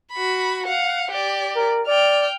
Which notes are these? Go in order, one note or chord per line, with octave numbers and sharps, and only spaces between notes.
F#4 B5
F5 F#5
G4 D5
A#4
D5 G5 F6